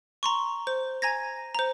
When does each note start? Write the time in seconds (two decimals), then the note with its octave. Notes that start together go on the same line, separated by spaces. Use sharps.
0.23 A#5 C6 C#6
0.67 C5
1.02 G#5 A#5 G#6 A#6
1.55 C5 A#5